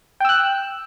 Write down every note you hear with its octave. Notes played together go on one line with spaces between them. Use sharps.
G5 E6 F#6